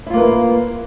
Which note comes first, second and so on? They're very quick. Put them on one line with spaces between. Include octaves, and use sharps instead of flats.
E4 F4 A#3 B4